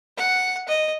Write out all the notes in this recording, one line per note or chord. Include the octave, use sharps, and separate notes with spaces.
F#5
D#5